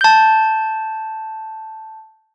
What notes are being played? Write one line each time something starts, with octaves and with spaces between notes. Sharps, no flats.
A5 G6